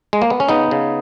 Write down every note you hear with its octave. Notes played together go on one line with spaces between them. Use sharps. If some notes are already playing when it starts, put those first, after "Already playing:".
G#3
A#3
B3
C#4
C#3 B3 D#4
C#3